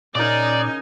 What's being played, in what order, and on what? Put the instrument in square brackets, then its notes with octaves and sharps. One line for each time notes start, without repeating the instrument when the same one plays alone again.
[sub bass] A#2 [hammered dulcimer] C#3 A#4 [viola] D#4 G#5 [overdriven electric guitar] D5